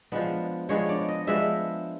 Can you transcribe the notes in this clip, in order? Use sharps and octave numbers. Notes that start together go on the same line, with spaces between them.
F3 G#3 B3 D4
F3 G#3 B3 D4 C#5
D5
D#5
F3 G#3 B3 D4 E5